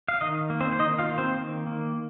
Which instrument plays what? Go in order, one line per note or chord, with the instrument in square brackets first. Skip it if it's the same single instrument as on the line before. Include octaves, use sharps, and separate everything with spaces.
[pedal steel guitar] F5
D#3 D#4 D#5
A#3
C4 C5
C5
D#3 D#4 D#5
F4 F5
A#3
C4 C5
D#3
A#3